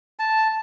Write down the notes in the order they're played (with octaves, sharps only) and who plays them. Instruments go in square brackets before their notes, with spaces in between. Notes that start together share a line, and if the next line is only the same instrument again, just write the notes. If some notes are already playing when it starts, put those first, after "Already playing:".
[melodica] A5